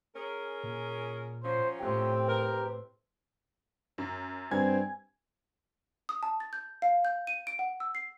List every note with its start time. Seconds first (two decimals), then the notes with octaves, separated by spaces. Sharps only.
0.16 C#4 G#4 A#4
0.63 A#2
1.43 F3 F#3 C#4 C5
1.79 A2 C4 G4 G5
2.28 A#4 B4
3.98 F#2
4.51 G2 C4 G#5 G#6
6.09 D#6
6.23 A5
6.40 A6
6.53 G6
6.82 F5
7.05 G6
7.27 D#7
7.47 D7
7.59 F#5
7.80 E6
7.95 C7